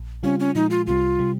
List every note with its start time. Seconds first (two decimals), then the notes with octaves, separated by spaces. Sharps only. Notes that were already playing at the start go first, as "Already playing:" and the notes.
Already playing: A#1
0.23 C#3 G3 C4 C#4 F4
0.40 C#4
0.55 A#2 F3 G#3 D#4
0.70 F4
0.87 C2 C3 G3 F4
1.19 C3 G3